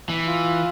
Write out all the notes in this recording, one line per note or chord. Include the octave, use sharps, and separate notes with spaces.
E3
F4